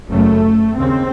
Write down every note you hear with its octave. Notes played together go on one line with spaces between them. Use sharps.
F#1 F#2 C#3 A3
D#2 C#3 C4